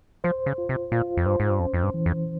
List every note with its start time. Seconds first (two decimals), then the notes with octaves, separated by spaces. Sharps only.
0.24 F3 C5
0.46 C#3
0.58 F4
0.69 C3
0.92 A#2 F4
1.17 F2
1.26 G2 C5
1.40 G#2
1.50 G2
1.60 F2 C#4
1.74 F2
1.83 G2
1.94 E3
2.06 F2